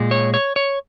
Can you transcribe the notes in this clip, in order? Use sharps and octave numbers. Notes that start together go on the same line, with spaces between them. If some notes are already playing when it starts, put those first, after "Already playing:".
Already playing: A#2 G#3
C#5
C#5
C#5